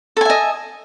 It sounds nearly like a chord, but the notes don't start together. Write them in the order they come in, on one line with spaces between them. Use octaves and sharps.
A4 G#5 E5 D#5